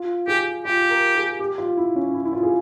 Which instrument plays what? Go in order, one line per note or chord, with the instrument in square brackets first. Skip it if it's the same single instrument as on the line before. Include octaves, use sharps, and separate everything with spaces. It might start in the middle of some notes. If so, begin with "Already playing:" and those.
Already playing: [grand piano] F4
[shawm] G4 [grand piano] G#4
[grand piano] F4 [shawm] G4
[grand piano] A#4
G#4
G4
F4
E4
C#4
E4
E4
F4
G#4